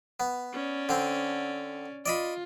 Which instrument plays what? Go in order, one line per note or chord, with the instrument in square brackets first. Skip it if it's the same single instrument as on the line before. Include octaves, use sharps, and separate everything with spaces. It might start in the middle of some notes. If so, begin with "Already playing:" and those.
[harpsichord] B3
[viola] C#4 D5
[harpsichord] D3 C4
[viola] F4 [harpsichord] D5 D#5 B5